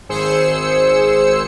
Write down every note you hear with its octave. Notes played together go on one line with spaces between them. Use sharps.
G#1 G#4 C5 E6 C#7